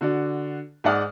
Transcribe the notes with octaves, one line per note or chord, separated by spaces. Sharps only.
D3 F#4 D5
G#2 G#4 D5 F#5 D#6 F6